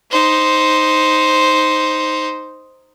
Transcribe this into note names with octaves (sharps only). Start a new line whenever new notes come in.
D#4 C5